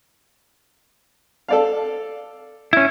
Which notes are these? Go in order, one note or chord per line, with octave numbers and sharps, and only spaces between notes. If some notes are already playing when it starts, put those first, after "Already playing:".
A4 D5 F5
C#4 E4